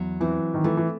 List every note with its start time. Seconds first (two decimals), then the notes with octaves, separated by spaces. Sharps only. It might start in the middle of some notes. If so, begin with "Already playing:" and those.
Already playing: E2 F#3
0.20 E3 C4
0.54 D#3
0.64 E3 A3
0.77 E3